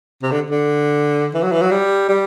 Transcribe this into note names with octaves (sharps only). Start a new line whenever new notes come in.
C3
D3
D3
E3
F#3
E3
F#3
G3
G3